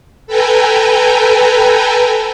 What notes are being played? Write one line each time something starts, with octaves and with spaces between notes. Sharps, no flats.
A4 B4 G5 G#5 A#5